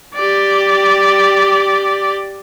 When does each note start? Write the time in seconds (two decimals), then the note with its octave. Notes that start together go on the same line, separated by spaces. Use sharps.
0.15 G4 D5